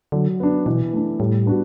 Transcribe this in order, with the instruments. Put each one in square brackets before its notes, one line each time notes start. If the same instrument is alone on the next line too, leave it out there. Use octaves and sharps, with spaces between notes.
[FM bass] D3 [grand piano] F#3
[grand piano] B3 D4
[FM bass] B2 [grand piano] E3
[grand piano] A3 D4
[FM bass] A2 [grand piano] G3
[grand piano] B3 D4 F#4